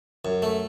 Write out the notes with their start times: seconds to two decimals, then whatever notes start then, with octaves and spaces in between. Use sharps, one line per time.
0.25 F#2
0.42 A3